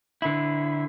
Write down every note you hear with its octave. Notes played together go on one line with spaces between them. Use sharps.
D3 E4